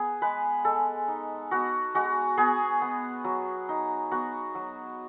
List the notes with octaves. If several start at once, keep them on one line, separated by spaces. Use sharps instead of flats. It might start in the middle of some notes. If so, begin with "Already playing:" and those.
Already playing: B3 G#4
G#3 B4
G#3 A4
D#4
B3 F#4
G#3 F#4
B3 G#4
B3
F#3
D#4
B3 F#4
F#3